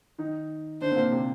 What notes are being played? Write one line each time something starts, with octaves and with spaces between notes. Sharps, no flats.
D#3 D#4
D3 D4 C5
C4
A#2 A#3
C3 C4